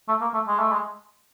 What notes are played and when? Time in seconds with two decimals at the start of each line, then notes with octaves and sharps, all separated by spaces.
0.08 A3
0.21 A#3
0.34 A3
0.48 G#3
0.59 A3
0.72 G#3